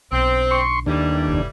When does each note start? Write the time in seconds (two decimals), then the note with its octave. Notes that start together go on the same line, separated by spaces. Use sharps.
0.12 B1 D3 C4
0.51 C6 C#6
0.86 D#2 A2 E3 G3 D4
1.27 F1 G#2